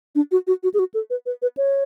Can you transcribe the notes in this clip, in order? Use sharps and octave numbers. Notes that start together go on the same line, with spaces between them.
D4
F#4
F#4
F#4
G#4
F#4
A4
B4
B4
B4
C#5